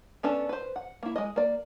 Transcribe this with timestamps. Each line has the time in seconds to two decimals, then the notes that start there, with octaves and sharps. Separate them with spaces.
0.23 B3 C#4 D4 A4
0.49 B4 C5
0.76 F#5
1.03 A#3 E4
1.16 G#3 D#5
1.36 A#3 D5